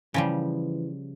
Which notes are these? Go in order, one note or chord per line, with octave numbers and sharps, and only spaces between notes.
C#3 E3 F3 G3